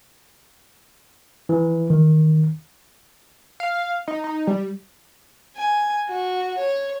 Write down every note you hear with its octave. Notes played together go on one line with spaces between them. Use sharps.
E3
D#3
F5
D#4
D#4
G3
G#5
F#4
C#5